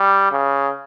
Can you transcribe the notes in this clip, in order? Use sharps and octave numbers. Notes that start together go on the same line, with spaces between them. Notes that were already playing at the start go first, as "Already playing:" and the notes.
Already playing: G3
C#3